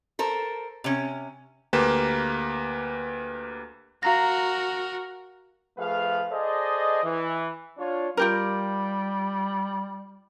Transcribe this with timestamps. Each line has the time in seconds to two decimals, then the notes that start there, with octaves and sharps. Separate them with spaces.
0.19 A4 A#4 C5
0.84 C3 C#4
1.73 D2 A#3 G4 B4 E7
4.03 F#4 A#4 F5 A#5 A#6
5.78 F3 A3 G#4 B4 F5
6.31 G#4 A4 C5 D5 D#5
7.04 E3
7.78 D4 F4 C#5
8.17 G3 F4 G4 A#4